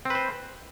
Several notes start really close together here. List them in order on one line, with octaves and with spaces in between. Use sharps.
C4 B4 C5